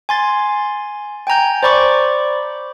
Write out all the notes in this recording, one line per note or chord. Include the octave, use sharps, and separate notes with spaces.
G#5 C6 A6
G5 G#5 A#5 G6
C5 D5 B5 C#6 D6